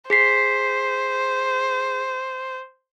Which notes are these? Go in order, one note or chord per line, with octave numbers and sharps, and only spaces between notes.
G#4 C5 B6 C7